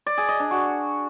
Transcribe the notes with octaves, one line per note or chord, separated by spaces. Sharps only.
D5
G#4
D#5
D4
F#4